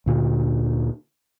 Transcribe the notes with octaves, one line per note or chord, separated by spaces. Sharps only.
D2 A#2 D3